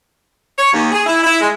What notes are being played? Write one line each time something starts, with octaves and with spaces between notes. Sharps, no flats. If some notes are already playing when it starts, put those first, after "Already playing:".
C#5
D#2
G#4
E4
E4
G#3